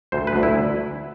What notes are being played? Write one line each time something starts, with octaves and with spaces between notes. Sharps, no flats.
D2 C5
B4
D2
E4